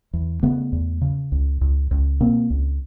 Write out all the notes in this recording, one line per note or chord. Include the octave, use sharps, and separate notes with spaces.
E2
C#3 A3 B3
E2
C#3
C#2
C#2
C#2
B2 A#3 C4
C#2